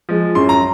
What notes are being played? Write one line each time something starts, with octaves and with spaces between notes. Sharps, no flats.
F3 G#3
F#2 C6
A#5